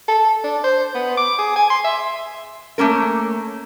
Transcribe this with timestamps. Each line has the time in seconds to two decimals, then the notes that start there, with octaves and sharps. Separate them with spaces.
0.08 A4
0.44 D4
0.64 C5
0.95 B3
1.17 D6
1.39 G#4
1.56 G#5
1.70 C6
1.84 E5
2.78 A3 A#3 C#4 A#4